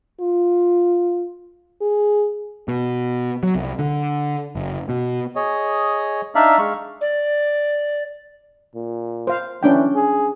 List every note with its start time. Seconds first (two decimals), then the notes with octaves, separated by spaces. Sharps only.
0.20 F4
1.81 G#4
2.68 B2
3.43 F#3
3.55 C2
3.79 D3
4.55 F#1
4.89 B2
5.36 G#4 C#5 D#5
6.35 D4 D#4 D5 E5 F5
6.59 G#3 F5 C#6
7.01 D5
8.75 A#2
9.27 C5 F5
9.63 E3 C#4 D4 G5
9.95 G#4